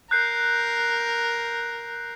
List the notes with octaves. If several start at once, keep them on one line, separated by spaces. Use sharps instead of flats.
A#4 F#6 G6 C7